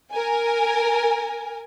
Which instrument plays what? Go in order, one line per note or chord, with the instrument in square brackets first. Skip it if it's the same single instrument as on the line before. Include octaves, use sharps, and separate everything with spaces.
[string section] A#4 G#5